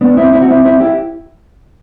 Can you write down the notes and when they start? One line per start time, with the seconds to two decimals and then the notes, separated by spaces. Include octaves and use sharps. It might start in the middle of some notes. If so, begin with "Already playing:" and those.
0.01 B3 D4
0.17 C4 E4
0.32 C4 E4
0.42 F#4
0.49 C4 E4
0.65 C4 E4
0.80 E4 G4